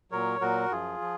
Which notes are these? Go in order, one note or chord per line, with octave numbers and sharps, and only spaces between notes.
A#2 F#3 A#4 C#5
A#2 F#3 F#4 A#4
F#2 F3 F4 G#4
F3